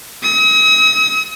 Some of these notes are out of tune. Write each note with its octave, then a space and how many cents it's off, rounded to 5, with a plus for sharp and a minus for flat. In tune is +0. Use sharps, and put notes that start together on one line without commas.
D#6 +45